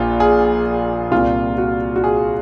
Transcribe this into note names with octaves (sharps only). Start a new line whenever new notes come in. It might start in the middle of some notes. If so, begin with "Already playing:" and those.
Already playing: A#1 A#2 F4
G#4
C2 A#2 F4
F#4
F#4
G#4